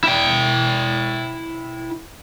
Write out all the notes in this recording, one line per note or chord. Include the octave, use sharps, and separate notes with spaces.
E4 G5